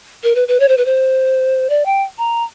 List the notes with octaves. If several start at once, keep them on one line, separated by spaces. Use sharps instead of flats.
A#4
B4
B4
C#5
C5
B4
C5
D5
G5
A#5